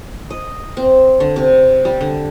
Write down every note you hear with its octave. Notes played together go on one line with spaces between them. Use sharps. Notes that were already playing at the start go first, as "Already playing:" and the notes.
D#5
C4
D3
C3
G3
D3